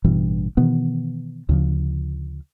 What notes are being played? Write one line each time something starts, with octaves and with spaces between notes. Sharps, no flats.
A1 G2 B2 E3
B2 D#3 E3 B3
D2 C#3 F3